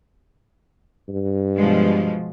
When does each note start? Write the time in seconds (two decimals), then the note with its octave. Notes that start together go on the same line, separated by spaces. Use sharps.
1.09 G2
1.57 B2 F3 G#3